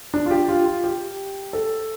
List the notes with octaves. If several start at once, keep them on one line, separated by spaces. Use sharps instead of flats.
D4
F4
G4
F4
F4
G4
A4